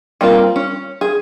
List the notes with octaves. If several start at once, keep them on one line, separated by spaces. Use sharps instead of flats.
G3 A#3 C4 F4
C#4
G#4